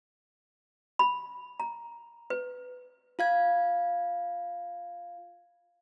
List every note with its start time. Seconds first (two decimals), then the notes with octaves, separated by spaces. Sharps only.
0.99 B5
1.60 A#5
2.30 B4
3.19 F4 F5 G#6